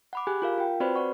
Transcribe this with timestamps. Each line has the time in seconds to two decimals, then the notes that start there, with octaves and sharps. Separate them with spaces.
0.13 F#5 B5 D6
0.27 G4 G#4 G#5 B5 F#6
0.42 F4 A#4 F5
0.58 F4 G5
0.80 C4 F#4 B4 C5 D5 B5
0.96 D5 F#5 C#6